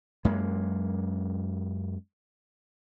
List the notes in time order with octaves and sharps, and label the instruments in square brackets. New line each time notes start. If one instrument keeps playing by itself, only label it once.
[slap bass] F#2 G#3 A#3